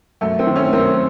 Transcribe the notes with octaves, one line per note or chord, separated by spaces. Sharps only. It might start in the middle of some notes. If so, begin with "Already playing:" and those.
F#2 A3
C4
D#3
A3 C#4
F#2 C4